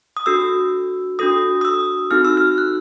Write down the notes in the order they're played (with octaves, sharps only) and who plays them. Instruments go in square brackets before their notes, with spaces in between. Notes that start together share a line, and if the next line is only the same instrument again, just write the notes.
[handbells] D#6
D4 F#4 A4 E6
D4 F#4 A4 D#6
D#6
E6
C4 D#4 F#4 A4 F6
E6
F6
F#6